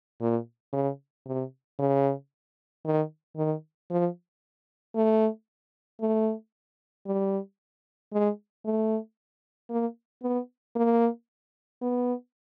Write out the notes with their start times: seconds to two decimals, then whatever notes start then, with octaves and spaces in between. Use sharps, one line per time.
0.21 A#2
0.73 C#3
1.26 C3
1.79 C#3
2.85 D#3
3.37 D#3
3.91 F3
4.95 A3
6.01 A3
7.06 G3
8.13 G#3
8.65 A3
9.70 A#3
10.23 B3
10.76 A#3
11.82 B3